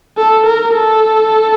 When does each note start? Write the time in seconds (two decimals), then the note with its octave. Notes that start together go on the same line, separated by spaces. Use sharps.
0.18 A4
0.46 A#4
0.74 A4